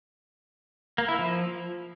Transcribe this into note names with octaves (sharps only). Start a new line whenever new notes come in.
A#3
E4
F3